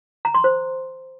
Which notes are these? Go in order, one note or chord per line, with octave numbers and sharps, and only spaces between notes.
A#5
C6
C5